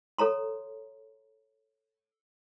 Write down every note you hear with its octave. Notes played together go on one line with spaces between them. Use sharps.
A4 C#5 A#5 C6